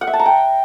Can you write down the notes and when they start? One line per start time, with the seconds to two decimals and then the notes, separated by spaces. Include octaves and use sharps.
0.01 F#5
0.07 E5
0.13 A5
0.20 A#5
0.26 G5